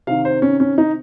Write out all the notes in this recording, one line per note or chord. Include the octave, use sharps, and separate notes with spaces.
C3 D#3 F5
C5
C#4
C#4
D#4